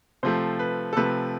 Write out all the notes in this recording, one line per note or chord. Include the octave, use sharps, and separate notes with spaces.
C3 F3 A3 C5
B4
A4
C3 F3 A3 B4